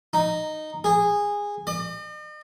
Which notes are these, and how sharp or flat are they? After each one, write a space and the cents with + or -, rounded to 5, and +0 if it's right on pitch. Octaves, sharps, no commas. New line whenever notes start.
D#4 -10
G#4 -15
D#5 -45